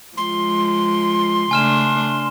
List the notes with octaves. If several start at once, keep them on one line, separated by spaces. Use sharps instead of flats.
F3 G#3 C6
C#3 A3 D4 G#5 F6 E7